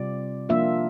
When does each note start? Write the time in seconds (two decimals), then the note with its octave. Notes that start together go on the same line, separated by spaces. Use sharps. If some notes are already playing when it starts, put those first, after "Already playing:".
Already playing: C3 G3 C4 F4 D5
0.49 F3 A#3 D4 F4 E5